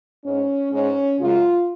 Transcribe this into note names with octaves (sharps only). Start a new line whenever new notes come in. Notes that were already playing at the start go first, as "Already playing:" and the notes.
G#2 G#3 C#4
G#2 G#3 C#4
F#2 C#3 G#3 F4